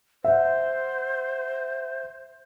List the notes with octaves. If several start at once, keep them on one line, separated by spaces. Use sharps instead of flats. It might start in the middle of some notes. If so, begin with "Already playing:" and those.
C5 E5 F#5